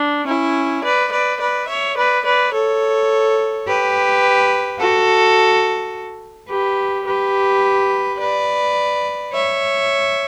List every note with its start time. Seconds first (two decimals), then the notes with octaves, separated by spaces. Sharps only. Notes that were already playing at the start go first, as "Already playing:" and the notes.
Already playing: D4
0.26 C#4 E4
0.83 B4 D5
1.11 B4 D5
1.39 B4 D5
1.67 C#5 E5
1.96 B4 D5
2.24 B4 D5
2.53 A4 C#5
3.66 G4 B4
4.79 F#4 A4
6.49 G4 B4
7.05 G4 B4
8.19 B4 D5
9.32 C#5 E5